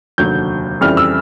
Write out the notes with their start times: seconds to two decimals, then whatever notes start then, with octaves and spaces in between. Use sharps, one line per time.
0.18 F1 D#2 D3 F#3 G6
0.81 F2 C#3 E3 G3 F6
0.97 E6